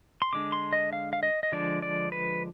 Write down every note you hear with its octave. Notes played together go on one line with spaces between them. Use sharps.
C6
D3 G#3 D4 D6
C6
D#5
F5
F5
D#5
D#5
D3 F3 G#3 D4 D5
D5
B4